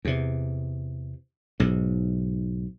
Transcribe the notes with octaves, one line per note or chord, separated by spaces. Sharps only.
E2 C3
B1 G#2